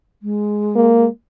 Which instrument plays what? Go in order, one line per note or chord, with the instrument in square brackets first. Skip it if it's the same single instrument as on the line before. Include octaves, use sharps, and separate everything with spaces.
[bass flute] G#3
[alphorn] A#3